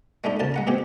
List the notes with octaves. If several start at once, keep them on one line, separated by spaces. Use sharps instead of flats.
G#3 A3 D4 D#4
D2 C#3 A#4 A5
G#3 F#5 A#5
B2 C4 G4 G#4